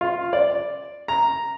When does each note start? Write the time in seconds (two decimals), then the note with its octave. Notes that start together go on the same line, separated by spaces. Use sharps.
0.01 F4
0.33 D5
1.08 A#5